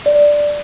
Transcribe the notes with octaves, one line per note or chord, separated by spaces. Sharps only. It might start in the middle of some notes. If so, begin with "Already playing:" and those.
D5